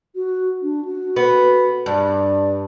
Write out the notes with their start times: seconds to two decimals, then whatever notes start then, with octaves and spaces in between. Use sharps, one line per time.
0.15 F#4
0.62 D4
0.85 F#4
1.16 B3
1.86 G2 D5